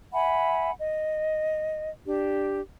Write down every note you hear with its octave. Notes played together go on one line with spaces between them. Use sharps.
E5 F#5 G#5 B5
D#5
D4 G4